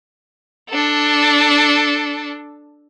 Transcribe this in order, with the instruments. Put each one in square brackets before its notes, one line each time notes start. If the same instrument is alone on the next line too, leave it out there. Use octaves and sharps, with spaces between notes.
[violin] D4 A4